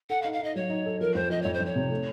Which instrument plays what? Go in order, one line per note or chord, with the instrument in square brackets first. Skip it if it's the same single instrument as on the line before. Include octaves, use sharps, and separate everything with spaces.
[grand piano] A4 [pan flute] F#5
[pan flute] F5
[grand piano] D#4
[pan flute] F5
[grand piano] D#4 [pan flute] D#5
[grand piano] F#3 [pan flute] C#5
[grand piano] D#4
A4
[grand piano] F3 [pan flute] A#4
[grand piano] F2 [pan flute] C5
[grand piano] F3 [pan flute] D#5
[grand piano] F2 [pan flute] C#5
[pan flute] C5
[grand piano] F2 [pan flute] C#5
[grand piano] C3
A3